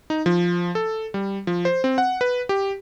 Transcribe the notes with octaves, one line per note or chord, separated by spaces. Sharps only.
D#4
F3
A4
G3
F3
C5
C4
F#5
B4
G4